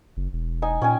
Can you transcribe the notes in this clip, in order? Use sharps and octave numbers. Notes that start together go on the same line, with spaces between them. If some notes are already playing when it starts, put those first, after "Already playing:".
F#1
E1
D#4 G#5
A#2 C#4 G5 G#5